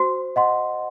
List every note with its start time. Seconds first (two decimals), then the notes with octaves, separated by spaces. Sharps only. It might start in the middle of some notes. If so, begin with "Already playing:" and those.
Already playing: F#4 C5
0.36 D#5 F#5 C6